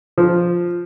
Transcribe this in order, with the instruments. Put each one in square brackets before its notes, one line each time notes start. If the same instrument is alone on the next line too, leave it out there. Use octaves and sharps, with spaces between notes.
[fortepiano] F3